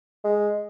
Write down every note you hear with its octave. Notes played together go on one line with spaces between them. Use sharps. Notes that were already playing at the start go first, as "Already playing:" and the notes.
G#3